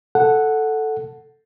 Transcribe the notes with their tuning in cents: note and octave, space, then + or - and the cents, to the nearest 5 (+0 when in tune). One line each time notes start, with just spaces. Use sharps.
A4 +0 F#5 +0